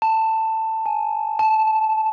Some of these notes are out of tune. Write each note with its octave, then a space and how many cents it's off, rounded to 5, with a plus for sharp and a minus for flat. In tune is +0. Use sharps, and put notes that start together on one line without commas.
A5 +15
G#5 +15
A5 -10